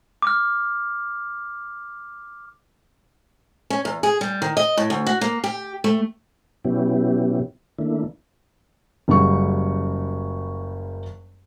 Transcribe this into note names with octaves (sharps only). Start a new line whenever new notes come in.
D6 F6
C#4
E2
G#4
G3
D#3
D#5
A2
D2
F#4
A#3
G4
A3
B2 F#3 B3 C#4 E4 G4
D#3 A3 A#3 D4 E4
F#1 C#3 F#3 G3 C#6